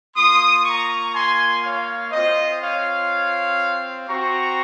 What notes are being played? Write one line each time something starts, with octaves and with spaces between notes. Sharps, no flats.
A#3 F4 C6 D#6
A#5 C#6
G#5 C6
C#5 F5
C4 F4 C5 D#5
C#5 F5
C4 F#4 A#5 C#6